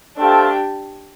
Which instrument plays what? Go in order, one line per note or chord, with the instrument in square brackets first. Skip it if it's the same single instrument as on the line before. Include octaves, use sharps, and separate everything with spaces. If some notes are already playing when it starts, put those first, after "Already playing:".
[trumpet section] A3 C4 A4 F5 [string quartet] D4 G4